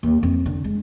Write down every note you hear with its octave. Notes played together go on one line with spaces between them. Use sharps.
D#2
F2
D3
G#3